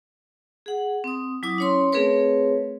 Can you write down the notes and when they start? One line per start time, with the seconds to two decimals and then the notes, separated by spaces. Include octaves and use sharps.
0.66 G#4 F#5
1.04 C4 D#6
1.43 F#3 E4 D6 D#6
1.58 C#4 C#5 C6
1.92 A3 C4 G#4 A#4 B4 C#5